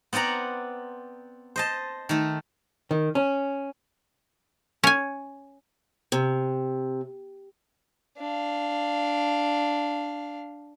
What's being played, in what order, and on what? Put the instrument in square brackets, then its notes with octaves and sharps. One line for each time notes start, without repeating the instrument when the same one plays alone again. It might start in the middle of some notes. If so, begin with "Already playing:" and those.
[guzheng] B3 C4 D5 F#5 A#5
C5 D#5 A5
D#3 A3
[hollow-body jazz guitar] D#3
C#4
[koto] C#4 G#5
[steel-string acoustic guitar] C3
[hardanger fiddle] D4 F5